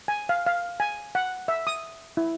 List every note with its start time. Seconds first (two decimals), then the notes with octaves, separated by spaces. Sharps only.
0.08 G#5
0.29 F5
0.47 F5
0.80 G#5
1.15 F#5
1.48 E5
1.67 D#6
2.17 E4